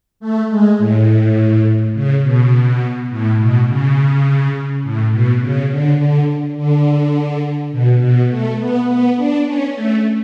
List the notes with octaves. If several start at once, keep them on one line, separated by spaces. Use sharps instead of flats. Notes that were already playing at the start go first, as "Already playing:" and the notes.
A3
G#3
A2
C#3
B2
A2
B2
C#3
A2
B2
C#3
D3
D3
D3
B2
B2
A3
B3
B3
D4
C#4
A3